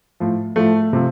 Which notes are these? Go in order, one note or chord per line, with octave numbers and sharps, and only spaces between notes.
A2 F3
A2 F3 A3
C3 F3